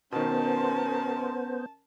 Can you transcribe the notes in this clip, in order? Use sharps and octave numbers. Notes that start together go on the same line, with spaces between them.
B2 D#3 B3 C#4 A#4 C5 A5